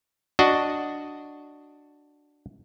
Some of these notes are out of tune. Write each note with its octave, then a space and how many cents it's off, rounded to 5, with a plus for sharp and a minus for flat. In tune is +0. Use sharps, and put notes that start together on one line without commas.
D4 +0 F#4 +0 D#5 +0